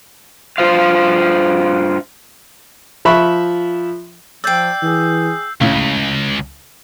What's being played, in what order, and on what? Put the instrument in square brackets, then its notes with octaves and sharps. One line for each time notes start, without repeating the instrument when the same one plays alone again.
[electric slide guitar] G2 F4 C5 F5
[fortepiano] F3 E5 B5 C#6 F#6
[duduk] F3 [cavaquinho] D5 G5 [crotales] E6 G6 C7
[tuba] E3 [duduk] G#4
[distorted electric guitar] C#2 [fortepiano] A2 C#3